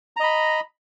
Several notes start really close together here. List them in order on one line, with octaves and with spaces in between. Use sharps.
A#5 D#5 B5